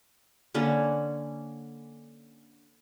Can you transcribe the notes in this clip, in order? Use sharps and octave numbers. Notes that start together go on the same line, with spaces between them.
D3 A#3 C#4 B4